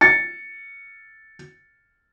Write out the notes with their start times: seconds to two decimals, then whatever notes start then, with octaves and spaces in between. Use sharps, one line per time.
0.01 A6 C#7